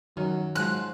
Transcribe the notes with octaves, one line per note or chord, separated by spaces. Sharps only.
F#2 D#3 F#3
G#2 F3 F#3 F#6